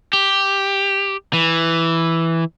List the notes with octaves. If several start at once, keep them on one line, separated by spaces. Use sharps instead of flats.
G4
E3